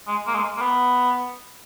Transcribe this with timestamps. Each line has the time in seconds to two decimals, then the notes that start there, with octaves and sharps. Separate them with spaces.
0.08 G#3
0.27 A#3
0.34 G#3
0.57 A#3
0.61 B3